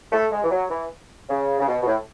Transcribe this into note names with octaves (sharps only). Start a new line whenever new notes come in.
A3
G#3
E3
F#3
E3
C#3
C#3
B2
B2
A2